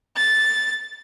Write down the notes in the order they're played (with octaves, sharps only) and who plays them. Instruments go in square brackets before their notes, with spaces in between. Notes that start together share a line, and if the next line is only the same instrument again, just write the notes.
[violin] A6